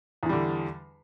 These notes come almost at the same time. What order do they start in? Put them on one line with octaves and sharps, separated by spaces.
E2 E3 G3 D3